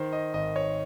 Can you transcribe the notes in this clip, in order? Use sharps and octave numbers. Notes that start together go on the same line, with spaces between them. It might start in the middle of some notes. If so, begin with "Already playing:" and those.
Already playing: D#3 C5
D#5
G#1 D#5
C#5